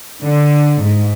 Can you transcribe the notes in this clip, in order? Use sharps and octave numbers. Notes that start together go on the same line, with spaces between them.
D3
G#2